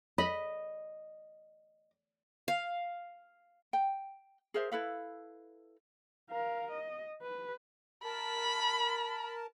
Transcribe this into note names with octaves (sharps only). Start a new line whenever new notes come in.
D#5 B5
F5
G5
G#4 A#4 C5 E5
E4 A4 B4 F5
A#4 F5
D#5
B4
A#4 A5 B5